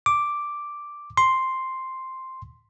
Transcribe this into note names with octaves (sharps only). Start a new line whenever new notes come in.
D6
C6